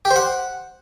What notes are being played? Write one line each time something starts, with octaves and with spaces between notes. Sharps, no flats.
G4
C5
F#5